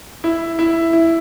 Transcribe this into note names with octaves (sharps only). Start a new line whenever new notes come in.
E4
E4
E4